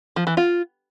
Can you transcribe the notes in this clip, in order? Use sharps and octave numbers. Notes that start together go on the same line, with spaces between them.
F3
E3
F4